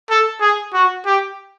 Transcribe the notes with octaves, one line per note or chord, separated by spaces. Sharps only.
A4
G#4
F#4
G4